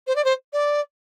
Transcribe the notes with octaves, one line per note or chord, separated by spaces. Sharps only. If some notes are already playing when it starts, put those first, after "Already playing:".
C5
D5
C5
D5